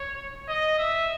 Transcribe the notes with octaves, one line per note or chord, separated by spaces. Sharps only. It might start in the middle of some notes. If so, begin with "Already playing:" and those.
Already playing: C#5
D#5
E5